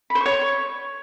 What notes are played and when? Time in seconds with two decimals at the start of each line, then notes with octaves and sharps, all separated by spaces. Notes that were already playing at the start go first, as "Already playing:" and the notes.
0.10 B5
0.15 C5
0.20 C#6
0.26 C#5